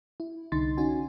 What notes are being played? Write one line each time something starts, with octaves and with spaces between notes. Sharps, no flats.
E4
C2 D3 D#4 C6 A6
C#4 D#4 F#4 G#5